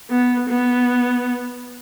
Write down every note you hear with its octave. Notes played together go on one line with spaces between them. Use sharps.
B3
B3